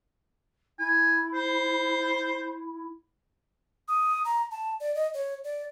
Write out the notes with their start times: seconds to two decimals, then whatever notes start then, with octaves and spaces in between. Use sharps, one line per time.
0.79 E4 G#5
1.34 C5
3.88 D#6
4.25 A#5
4.51 A5
4.80 D5
4.95 D#5
5.14 C#5
5.44 D5